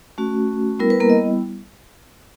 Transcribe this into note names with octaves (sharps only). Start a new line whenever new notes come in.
A3 C#4 F#4
G3 B3 E4 A#4
B4
A#3 A#4
D#5